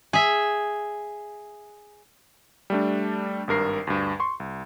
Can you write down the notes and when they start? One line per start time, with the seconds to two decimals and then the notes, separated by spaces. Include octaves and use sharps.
0.13 G#4 E5
2.70 G3 A3 D4
3.48 G#1 G2 A#4 C7
3.87 D2 G2
4.20 C6 C#6
4.40 C2